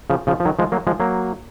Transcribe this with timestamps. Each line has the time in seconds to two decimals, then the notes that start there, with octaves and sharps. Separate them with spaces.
0.10 C#3 F3
0.27 C#3 F3
0.40 F3
0.45 D#3 F#3
0.59 F3 G#3
0.72 F#3 A#3
0.87 F3 G#3
1.00 F#3 A#3